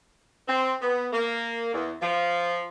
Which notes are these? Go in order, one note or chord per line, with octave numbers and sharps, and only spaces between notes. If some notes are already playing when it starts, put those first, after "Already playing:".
C4
B3
A#3
E2
F3